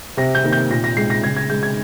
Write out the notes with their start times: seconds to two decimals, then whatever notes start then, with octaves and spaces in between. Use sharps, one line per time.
0.17 C3 A#6
0.35 G6
0.44 D#3 A#3
0.52 G6
0.70 A#2 A#6
0.84 A#6
0.97 G#3 C7
1.10 A#6
1.24 C#3 G#6
1.37 G#6
1.50 G#3 G6
1.63 G#6